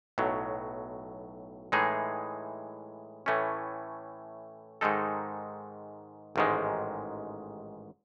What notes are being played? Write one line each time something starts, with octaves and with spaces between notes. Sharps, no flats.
B1 A2 F#3
A2 E3 G#3 D#4 G#4
A2 E3 A3 C#4
G#2 D#3 G#3 D#4 A4
A1 G#2 D#3 G#3